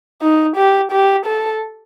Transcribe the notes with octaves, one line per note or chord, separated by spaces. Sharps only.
D#4
G4
G4
A4